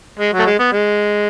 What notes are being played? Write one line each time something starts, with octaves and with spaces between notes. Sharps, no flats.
G#3
F#3
A3
G#3
B3
G#3